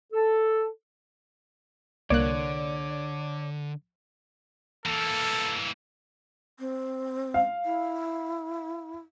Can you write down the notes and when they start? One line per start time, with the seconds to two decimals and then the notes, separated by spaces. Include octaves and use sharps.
0.12 A4
2.10 C2 D3 A#3 C#5 D5 F#6
4.86 E3 A#3 A4
6.59 C4
7.34 F5
7.65 E4